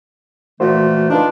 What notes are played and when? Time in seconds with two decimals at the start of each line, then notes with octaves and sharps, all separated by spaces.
0.60 A#2 E3 A3 F4 F#4 C5
1.10 D4 D#4 F4 B4